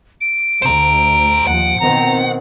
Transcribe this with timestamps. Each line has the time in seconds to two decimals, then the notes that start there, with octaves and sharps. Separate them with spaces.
0.21 D7
0.62 D2 C5 A#5
1.47 D#2 F3 F#5
1.80 B2 D#3 C4 A#5